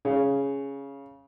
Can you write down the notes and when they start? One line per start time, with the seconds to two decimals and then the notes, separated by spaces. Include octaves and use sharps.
0.05 C#3